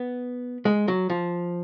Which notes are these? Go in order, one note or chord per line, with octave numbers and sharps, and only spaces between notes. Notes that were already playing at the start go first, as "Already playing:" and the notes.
Already playing: B3
G#3
F#3
F3